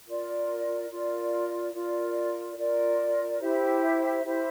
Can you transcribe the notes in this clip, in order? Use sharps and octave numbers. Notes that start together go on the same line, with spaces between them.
F4 A#4 D5
F4 A#4 D5
F4 A#4 D5
F4 A#4 D5
E4 G4 C5 E5
E4 G4 C5 E5